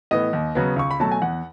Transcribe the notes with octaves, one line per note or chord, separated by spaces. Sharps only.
A2 E3 B3 D#5
D#2
C#3 F#3 B3
C#2 C#6
B5
B2 F#3 A3 A5
G#5
E2 F#5